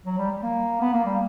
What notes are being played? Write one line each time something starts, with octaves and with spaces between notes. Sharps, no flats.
F#3
G3
G3
A#3
B3
A#3
G3